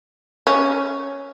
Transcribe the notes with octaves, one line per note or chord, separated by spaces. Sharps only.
C#4